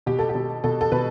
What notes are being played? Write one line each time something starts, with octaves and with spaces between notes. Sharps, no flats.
B2 G4
A4
G4
B2
B2 A4
A4
B2 B4